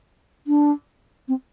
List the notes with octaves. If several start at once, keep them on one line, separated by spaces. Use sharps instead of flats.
D4
C4